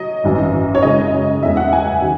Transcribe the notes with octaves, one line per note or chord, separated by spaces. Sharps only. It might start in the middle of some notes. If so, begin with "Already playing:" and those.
Already playing: F#3 D#5
G#1 F#2 E3
C#5
F#2 C#3 G#3 D#5
F#1 E2 C#3 E3 G#3 E5
F#5
G#5
D#3 F#3